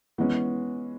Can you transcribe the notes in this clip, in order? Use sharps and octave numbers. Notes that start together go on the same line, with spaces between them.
E3 G#3 B3 C#4